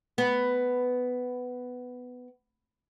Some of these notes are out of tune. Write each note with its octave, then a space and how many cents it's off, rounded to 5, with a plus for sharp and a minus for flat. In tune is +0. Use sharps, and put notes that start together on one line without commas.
B3 +10